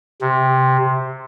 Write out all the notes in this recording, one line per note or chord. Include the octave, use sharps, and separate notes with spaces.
C3